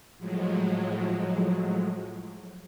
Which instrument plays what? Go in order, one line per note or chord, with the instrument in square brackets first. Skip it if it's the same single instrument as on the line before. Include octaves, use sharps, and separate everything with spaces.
[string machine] A2 F3 F#3 G#3